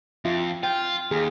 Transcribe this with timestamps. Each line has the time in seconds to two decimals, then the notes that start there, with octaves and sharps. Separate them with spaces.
0.25 F2 F4 E5
0.63 F4 G5
1.11 D#2 G#4